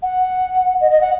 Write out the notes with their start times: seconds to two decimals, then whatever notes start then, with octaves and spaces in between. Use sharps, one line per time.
0.03 F#5
0.81 D#5
0.91 D#5
1.01 F#5